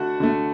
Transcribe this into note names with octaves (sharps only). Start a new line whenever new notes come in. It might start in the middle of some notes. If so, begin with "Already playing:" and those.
Already playing: D3 A3 F#4 F#5
D3 A3